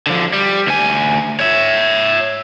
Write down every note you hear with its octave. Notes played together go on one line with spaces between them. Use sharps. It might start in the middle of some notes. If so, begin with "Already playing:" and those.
D3 F3
G3
D2 G#5
C#5 E5